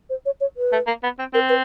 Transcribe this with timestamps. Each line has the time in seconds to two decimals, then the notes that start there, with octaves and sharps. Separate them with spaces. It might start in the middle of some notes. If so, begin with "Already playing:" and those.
0.09 C5
0.25 C#5
0.40 C#5
0.57 B4
0.72 A3
0.87 A#3
1.03 B3
1.19 C4
1.34 C4 A#4
1.49 B4